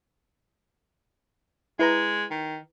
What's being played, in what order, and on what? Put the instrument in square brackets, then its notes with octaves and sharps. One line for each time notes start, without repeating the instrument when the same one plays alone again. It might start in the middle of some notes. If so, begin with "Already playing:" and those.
[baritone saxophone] G#3 [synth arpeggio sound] E4 B4 A#5
[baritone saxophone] D#3